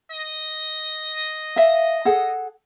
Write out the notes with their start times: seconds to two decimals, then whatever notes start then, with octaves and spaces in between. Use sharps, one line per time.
0.12 D#5
1.56 E5 F5
2.05 G#4 A4 F#5